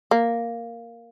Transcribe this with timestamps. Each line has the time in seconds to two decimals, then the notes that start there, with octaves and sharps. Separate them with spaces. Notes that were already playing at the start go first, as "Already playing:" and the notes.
0.11 A#3